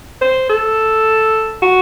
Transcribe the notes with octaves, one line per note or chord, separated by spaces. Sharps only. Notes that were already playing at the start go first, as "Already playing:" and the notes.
C5
A4
F#4